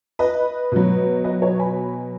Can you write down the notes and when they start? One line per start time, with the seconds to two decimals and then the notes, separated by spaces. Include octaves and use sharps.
0.19 B4 D#5
0.72 B2 F#3
1.24 B4 D#5
1.42 C#5
1.59 G#5 B5